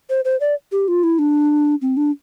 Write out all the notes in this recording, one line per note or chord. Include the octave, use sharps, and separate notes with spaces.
C5
C5
D5
G4
F4
E4
D4
C4
D4